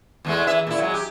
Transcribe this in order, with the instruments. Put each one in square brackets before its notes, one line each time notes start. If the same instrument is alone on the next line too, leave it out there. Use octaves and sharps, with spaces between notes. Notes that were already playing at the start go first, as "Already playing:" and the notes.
[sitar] E2 G#3 A3
E3 E5
A#2 E4
F#3 G#3
G4